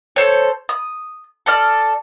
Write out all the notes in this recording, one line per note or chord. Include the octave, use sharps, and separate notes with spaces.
A4 C5 C#5
D#6
A4 D5 F6